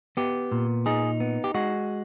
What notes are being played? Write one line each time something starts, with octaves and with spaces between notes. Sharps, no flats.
B3 G4
A#2
D#4 G#4
B3
G4
G#3 F#4